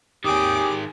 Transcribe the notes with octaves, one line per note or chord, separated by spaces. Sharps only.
D#2 D#3 G4 G#4 G5 D6 D#6